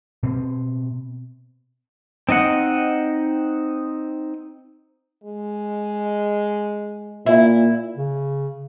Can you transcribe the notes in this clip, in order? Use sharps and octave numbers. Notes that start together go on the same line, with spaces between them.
B2 C4
C4 D#4 D#5 F#5
G#3
A#2 E4
C#3